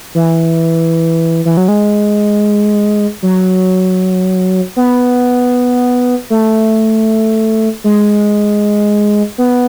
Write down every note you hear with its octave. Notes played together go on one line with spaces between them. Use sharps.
E3
E3
F#3
G#3
F#3
B3
A3
G#3
B3